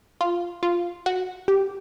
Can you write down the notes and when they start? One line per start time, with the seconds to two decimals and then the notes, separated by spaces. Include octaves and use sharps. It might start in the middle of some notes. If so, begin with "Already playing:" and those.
0.21 F4
0.63 F4
1.06 F#4
1.48 G4